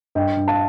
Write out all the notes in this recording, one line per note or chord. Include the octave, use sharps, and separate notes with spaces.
G2 D#5 G5
G2
F5 A5